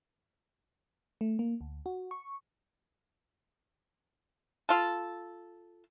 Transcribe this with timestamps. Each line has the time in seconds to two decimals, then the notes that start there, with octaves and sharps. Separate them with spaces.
1.21 A3
1.39 A#3
1.61 D2
1.86 F#4
2.11 C#6
4.69 F4 A4